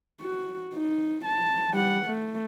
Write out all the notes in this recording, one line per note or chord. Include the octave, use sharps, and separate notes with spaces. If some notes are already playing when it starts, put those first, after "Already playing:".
F#4
D#4
A5
G3 F#5
A3